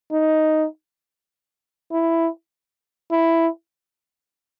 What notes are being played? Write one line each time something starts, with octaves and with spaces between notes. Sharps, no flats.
D#4
E4
E4